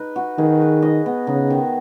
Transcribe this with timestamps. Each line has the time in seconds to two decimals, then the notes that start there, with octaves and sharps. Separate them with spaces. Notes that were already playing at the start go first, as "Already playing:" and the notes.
Already playing: D#4 B4
0.16 F#4
0.38 D#3 G#4
0.61 B4
0.82 D#5
1.06 B3
1.27 C#3 D#4
1.50 D#3